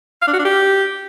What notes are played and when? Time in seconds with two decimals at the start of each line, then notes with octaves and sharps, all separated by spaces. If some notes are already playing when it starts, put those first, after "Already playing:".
0.22 F5
0.28 D4
0.33 F#4
0.39 D4
0.45 G4